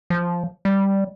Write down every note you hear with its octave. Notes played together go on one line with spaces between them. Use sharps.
F3
G3